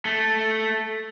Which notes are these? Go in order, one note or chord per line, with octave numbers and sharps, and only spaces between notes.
A3